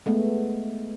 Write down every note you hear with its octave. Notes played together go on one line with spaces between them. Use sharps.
G#3 A3 B3